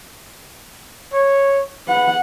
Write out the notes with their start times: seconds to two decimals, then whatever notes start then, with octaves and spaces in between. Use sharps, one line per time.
1.13 C#5
1.88 B4 F#5